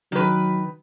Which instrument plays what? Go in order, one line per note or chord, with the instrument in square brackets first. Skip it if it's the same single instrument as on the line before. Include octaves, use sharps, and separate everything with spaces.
[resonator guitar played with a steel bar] D#3 B4 [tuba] F#3